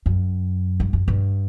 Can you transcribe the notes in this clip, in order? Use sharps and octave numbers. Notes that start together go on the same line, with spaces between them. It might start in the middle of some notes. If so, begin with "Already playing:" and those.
F#2
G2
F#2
G2